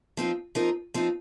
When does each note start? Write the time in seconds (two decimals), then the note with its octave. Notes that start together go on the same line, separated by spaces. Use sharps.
0.17 F3 C4 D#4
0.55 F3 C4 D#4 A#4
0.94 F3 C4 D#4